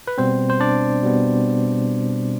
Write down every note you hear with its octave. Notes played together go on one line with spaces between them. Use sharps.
B4
B2 G3 B3 C4 C5
C5
D4 D5
B2 G3 B3